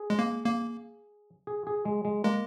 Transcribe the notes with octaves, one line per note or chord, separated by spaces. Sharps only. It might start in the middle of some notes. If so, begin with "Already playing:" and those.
Already playing: G#4
G#3
A#3
A#3
G#4
G#4
G#3
G#3
G#3 A#3